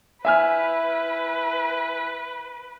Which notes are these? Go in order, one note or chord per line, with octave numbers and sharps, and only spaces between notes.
E4 B4 E5 G#5 F6